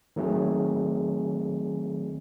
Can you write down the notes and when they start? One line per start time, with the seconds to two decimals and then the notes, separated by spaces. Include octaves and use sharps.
0.16 D#3 F#3 A3 C4 G#4